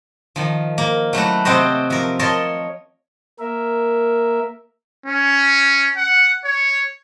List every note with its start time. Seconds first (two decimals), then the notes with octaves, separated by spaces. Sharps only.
0.36 D#3 F3
0.78 A#3
1.13 F#3 A3 E4 F#4
1.45 C3 C4 F#4 C5 D#5
1.90 F3 A#4
2.19 A#4 C#5 D#5 A5 C6
3.39 A#3 A#4 E5
5.06 C#4
5.97 F#5
6.45 C#5